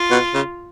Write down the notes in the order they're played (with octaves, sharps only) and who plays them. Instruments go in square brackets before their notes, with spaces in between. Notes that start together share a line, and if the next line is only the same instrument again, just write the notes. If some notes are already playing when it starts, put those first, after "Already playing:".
Already playing: [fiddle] F4
[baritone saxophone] B2
C#3